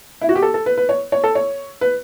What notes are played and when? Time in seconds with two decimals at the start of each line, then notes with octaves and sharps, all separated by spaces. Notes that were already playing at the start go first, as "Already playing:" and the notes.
0.21 E4
0.29 F#4
0.35 G4
0.42 A4
0.54 A4
0.66 B4
0.77 B4
0.89 C#5
1.12 C#5
1.24 A4
1.35 C#5
1.81 B4